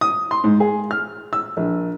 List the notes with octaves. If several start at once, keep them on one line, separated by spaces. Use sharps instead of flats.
D#6
C6
G#2
G#4
F6
E6
A#1